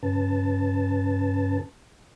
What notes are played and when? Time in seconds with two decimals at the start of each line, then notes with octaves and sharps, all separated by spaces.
0.03 G2 C#3 C#4 B4 A5 A6